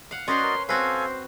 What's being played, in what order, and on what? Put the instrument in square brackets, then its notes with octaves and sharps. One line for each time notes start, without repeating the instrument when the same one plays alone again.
[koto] F5 F#5
[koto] C#4 B4 C5 [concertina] F#4 D5 D#5 [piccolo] C6
[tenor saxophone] A#4
[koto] C4 F#4 B4 [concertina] A4 F5 [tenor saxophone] C5 [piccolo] G#5